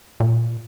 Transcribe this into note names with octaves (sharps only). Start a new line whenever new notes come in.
A#2